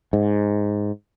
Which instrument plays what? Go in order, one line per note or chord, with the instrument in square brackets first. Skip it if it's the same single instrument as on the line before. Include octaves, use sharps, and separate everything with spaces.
[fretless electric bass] G#2